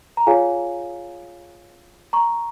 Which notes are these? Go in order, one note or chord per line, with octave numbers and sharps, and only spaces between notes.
A#5
F4 G#4 C#5 F5 G#5
A#5 C#6